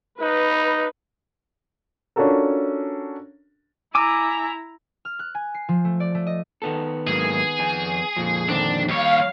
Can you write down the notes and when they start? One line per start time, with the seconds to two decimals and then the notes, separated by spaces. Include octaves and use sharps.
0.21 D#4 B4
2.16 C#4 D4 F4 F#4 A4 A#4
3.95 E4 G#5 A#5 D6 E6
5.05 F6
5.19 F#6
5.35 G#5
5.55 C7
5.69 F3
5.85 A3
6.00 D5
6.15 A3
6.27 D#5
6.62 D#3 B3 A4
7.07 G#2 F#3 A#3 G#4
7.59 F2 G#5
8.16 F2 A#2 F3
8.49 D3 D#3 C4 D4
8.89 D#2 G3 C#5 F5